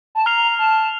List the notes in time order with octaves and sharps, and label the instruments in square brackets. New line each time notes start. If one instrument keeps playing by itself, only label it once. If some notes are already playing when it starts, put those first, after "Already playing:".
[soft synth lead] A5
[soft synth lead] A#5 [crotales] F6 C7 F7
[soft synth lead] A5